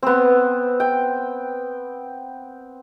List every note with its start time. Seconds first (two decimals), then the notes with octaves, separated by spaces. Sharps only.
0.03 B3 C4
0.80 G5